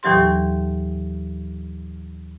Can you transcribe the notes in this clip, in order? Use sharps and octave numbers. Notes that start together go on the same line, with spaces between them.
D#2 A2 E3 F#3 G4 C6